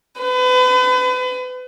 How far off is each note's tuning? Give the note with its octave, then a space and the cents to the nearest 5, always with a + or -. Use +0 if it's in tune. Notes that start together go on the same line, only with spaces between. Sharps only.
B4 +35